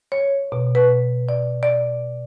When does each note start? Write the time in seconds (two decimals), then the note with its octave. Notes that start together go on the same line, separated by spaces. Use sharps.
0.12 C#5
0.52 B2
0.75 B4
1.29 D5
1.63 D5